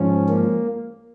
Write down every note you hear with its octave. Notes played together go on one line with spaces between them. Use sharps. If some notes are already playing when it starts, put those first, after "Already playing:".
Already playing: G#2 F3 C#4
A#3